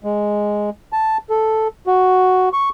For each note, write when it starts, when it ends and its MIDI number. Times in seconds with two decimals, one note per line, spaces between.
0.04 0.70 56
0.93 1.18 81
1.30 1.68 69
1.87 2.49 66
2.53 2.69 85